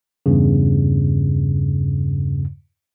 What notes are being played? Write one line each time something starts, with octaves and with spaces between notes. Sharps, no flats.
E2 G2 C#3